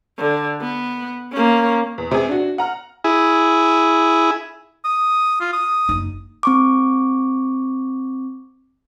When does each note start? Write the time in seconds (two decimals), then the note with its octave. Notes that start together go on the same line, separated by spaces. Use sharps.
0.18 D3
0.61 B3
1.32 A#3 C#4
1.98 E2
2.11 C3 G#4
2.28 D4 F#4
2.58 F#5 A#5 F6
3.04 E4 G#4
4.85 D#6
5.41 F4
5.53 D#6
5.89 F#1 D#4
6.43 C4 C#6 D6